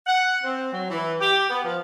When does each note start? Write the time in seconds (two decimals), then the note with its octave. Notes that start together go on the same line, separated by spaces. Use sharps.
0.07 F#5
0.43 C4
0.72 F#3
0.90 E3
1.20 G4
1.48 B3
1.65 F3